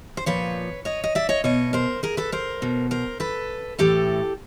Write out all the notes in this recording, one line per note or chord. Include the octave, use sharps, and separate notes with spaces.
C5
A#2 F3 B4 C#5
C#5 D#5
D#5
D5 E5
C#5 D#5
B2 C#5 D#5
A#4 C5
G#4 A#4
A4 B4
A#4 C5
B2
A#4 C5
A4 B4
A2 E3 G4 A4